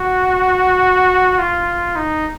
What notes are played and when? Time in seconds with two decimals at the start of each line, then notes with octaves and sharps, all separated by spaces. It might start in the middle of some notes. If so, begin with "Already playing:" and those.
Already playing: F#4
1.39 F4
1.96 D#4